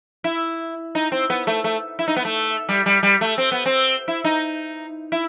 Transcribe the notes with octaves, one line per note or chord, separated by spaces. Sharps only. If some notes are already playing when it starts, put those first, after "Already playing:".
E4
D#4
C4
B3
A3
A3
E4
D#4
B3
A3
G3
G3
G3
A3
C4
B3
C4
E4
D#4
E4